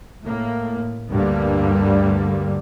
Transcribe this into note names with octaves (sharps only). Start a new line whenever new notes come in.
A2 A#3
D2 G2 D3 G3 A#3